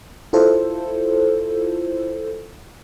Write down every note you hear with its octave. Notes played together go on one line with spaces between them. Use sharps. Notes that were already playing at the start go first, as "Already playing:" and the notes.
E4 F4 A4 C5